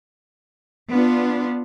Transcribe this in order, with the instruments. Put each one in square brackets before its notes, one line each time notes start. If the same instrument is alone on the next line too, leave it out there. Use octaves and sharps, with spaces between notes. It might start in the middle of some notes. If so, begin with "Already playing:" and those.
[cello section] B3 D4 F4